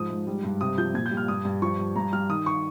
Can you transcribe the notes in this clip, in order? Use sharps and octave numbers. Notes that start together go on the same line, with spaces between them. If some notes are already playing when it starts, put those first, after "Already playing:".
Already playing: G#2 F3 D#6
G#2
G3
G2
C3 D#6
F3 G6
A#2 G#6
G6
G3
F6
G2 D#6
G2
F3 C#6
G2
G2 A#5
G3 F6
D#3 D#6
C#6